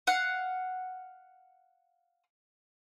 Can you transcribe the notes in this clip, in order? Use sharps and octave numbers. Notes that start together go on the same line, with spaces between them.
F5 F#5